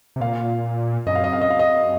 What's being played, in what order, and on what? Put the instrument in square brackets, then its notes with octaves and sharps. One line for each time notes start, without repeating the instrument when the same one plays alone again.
[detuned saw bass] C3
[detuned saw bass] A#2 [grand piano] F5
[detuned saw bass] F#2 [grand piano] D#5
[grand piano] F5
D#5
F5
D#5
F5
D#5